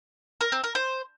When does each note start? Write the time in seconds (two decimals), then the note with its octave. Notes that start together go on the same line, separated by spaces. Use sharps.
0.41 A#4
0.52 C4
0.64 A#4
0.75 C5